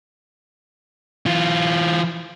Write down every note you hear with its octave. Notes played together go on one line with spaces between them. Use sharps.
E3 F4